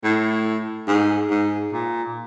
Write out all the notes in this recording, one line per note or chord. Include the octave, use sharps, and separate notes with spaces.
A2
G#2
G#2
A#2